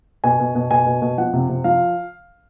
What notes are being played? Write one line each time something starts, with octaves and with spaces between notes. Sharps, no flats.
B2 G#5
B2
B2
B2 G#5
B2
B2
F3 F#5
C3
C3
F3 F5